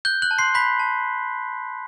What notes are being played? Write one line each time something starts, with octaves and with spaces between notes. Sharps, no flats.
F#6 G6 G7
F#6 F#7
A5
C6 C7
B5 G6 B6
A5